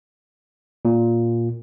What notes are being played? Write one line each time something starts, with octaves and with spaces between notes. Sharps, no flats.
A#2